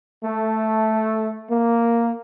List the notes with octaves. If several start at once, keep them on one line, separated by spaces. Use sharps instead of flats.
A3
A#3